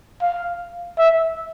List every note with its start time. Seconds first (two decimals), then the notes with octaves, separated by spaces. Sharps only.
0.22 F5
0.98 E5